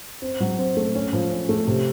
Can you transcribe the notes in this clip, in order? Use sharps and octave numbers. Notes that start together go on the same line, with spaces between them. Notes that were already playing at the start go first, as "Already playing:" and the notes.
C4
F#3
C4
A3
C#4
F3
C#4
A3
C3